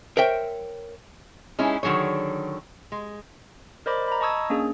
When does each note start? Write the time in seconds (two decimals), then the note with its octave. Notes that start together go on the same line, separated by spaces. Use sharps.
0.17 A#4 C5 C#5 E5 G5
1.59 G#3 C#4 D#4 E4
1.83 D3 D#3 F#3 G#4 C#5
2.92 G#3
3.86 A#4 C5 D5 D#5 B5 D6
4.08 A#5 B5
4.21 D#5 A5 C#6 D#6 E6 G#6
4.50 A#3 C#4 D4 G#4